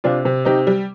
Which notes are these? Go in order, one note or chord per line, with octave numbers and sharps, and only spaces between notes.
C3 D4 F4
C3
C3 D#4 G4
G3